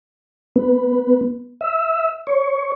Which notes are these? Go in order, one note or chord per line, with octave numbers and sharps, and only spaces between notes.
B3
E5
C#5